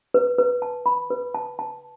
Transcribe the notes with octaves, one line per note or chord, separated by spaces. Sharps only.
B4
B4
A5
B5
B4
A5
A5